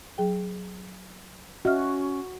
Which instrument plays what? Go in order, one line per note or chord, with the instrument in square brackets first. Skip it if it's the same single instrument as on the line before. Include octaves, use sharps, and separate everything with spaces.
[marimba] F#3 G#4 G5
[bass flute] C#4 [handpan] F#4 [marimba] D#5 E5 F6